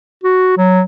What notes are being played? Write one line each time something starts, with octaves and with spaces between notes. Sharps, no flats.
F#4
F#3